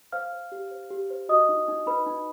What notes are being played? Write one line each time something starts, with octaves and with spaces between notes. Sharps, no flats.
C5 F5 F6
C5
G4
C5
G4
C5
F#4 D#5 D#6
D#4
D#4
D#4 B4 B5
D#4